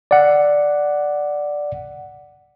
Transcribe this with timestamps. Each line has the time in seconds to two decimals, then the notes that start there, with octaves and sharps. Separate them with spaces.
0.11 D5 F#5